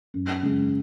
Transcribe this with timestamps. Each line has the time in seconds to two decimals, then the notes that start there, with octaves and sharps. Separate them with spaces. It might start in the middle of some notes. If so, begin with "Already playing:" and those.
0.14 F#2
0.43 C#3 G#3